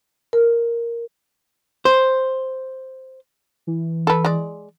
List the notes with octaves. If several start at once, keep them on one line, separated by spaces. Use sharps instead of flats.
A#4
C5
E3
A4 B4
G#3 D5